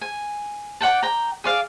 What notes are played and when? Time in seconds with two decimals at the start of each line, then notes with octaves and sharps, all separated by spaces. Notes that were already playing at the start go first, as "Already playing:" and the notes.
0.01 G#5
0.81 D5 F#5 G5 A5
1.03 G5 A#5
1.44 G#4 D5 F5